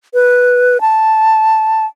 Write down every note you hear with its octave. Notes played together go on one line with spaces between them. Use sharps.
B4
A5